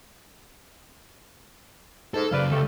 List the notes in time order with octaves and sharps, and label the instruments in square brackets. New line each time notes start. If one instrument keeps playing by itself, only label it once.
[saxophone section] G#2 [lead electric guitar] A4
[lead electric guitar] F#2 C#3 [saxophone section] B4 D5 F5
[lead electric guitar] C#2 [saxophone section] A3 G4 A4